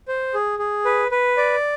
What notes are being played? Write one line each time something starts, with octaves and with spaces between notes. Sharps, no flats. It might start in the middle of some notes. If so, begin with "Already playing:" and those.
C5
G#4
G#4
B4
B4
D5